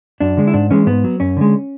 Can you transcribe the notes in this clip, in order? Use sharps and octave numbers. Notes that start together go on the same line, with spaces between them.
F#2 D4
D3 G#3
E4
G#2 D4
E3 G#3 C#4
G#2 B3
F#3
F#2 C#4
D3 G#3